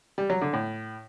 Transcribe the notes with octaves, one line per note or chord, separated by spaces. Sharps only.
G3
F#3
D3
A2